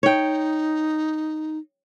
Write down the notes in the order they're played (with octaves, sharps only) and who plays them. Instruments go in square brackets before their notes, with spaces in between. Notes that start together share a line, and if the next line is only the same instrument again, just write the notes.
[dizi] D#4 [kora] C#5 G5